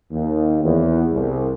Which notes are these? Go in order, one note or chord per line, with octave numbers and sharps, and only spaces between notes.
D#2
E2
C2